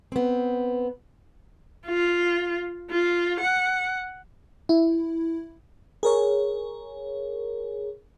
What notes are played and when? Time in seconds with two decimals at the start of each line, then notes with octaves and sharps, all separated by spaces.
0.12 B3 C4
1.86 F4
2.91 F4
3.40 F#5
4.69 E4
6.03 G#4 A#4 C#5